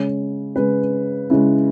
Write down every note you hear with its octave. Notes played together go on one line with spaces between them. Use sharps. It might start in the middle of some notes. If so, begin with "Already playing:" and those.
Already playing: C#3 G#3 C#5
C#3 G#3 B4
C#3 G#3 E4